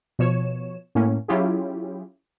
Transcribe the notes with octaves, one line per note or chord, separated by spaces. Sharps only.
B2 F3 C#5 E7
A2 A#3 C#4
F#3 C#4 E4 F4 G4 G#4